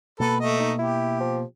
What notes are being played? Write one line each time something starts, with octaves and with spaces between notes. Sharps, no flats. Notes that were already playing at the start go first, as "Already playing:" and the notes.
B2 A#3 A4 B4
A3 D#5
D#4
E4 G4
F3